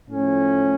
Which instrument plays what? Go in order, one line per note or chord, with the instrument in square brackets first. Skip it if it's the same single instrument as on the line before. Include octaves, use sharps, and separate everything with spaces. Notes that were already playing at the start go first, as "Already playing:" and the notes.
[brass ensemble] A2 F3 A3 C#4